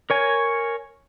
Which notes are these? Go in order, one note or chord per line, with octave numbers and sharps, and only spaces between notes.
A#4 C#5 G#5